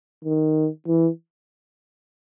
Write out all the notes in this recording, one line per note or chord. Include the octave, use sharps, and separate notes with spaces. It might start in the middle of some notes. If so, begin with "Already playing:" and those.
D#3
E3